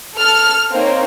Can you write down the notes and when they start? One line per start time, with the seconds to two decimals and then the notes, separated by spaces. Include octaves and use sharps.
0.16 A4 F6
0.71 A#3 C4 D#4 C#5